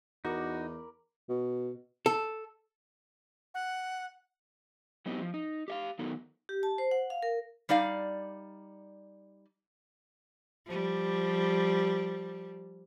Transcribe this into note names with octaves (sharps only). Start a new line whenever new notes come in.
E2 D#4 F#4 A#4 D5 B5
B2
A4
F#5
F#3 B3 C4 D#4 E4 G4
F3
D#4
G4 E5 F5
D#3 F#3 B3 D#4 A4
G4
A5
C5
F#5
F5
A#4
G3 D#4 D5 F5
F3 G3